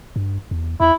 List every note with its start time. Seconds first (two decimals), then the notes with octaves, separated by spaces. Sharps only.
0.16 G2
0.51 E2
0.80 E2 E4